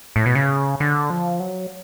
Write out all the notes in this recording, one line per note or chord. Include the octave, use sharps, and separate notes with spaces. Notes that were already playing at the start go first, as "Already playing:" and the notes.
A2
B2
C#3
D3
F3
F#3